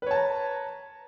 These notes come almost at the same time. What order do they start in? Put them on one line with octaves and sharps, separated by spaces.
B4 C#5 A5 A#5